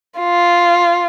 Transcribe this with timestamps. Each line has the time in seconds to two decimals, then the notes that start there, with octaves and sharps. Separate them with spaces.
0.19 F4